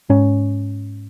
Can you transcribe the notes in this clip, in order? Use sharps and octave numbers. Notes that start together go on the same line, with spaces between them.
G#2 C#4